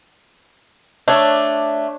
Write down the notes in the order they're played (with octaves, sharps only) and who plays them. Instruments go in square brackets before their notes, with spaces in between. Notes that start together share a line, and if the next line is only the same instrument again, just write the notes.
[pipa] A3 [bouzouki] D4 C#5 D5